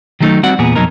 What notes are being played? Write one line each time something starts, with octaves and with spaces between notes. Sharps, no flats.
D#3 F#3 G3 A3 D#4
G3 C4 F#4 D5 F#5
E2 A#2 B3 G#4
F2 B2 F#3 D#4 A#4